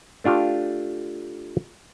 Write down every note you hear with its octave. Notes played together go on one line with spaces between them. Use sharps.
A3 D4 F4 G4